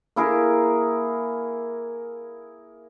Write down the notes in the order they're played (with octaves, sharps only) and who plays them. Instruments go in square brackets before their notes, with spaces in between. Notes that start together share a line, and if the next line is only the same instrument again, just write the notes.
[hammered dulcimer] A#3 E4 G#4 A#4